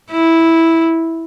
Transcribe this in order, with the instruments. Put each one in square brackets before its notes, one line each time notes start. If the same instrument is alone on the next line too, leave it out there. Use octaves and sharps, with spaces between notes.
[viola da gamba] E4